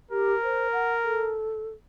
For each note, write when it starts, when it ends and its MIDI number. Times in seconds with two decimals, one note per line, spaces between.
0.11 0.33 67
0.11 1.36 70
0.43 0.68 72
0.73 0.93 78
1.04 1.70 69